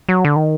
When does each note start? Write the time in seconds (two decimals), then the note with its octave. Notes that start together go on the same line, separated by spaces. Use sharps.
0.09 F#3
0.25 D3
0.36 D#3